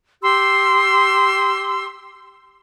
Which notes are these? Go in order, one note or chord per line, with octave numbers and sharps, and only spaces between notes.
G4 C6 E6